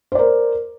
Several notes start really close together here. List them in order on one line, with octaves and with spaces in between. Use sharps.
C5 D5 A#4